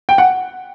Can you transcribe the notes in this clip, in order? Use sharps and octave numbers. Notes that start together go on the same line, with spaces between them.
G5
F#5